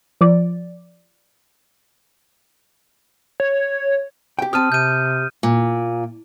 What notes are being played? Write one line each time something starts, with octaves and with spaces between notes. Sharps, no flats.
F3 D5
C#5
G4 G5
C4 G4 A5 D#6 F6 D#7
C3 G6 D#7
A#2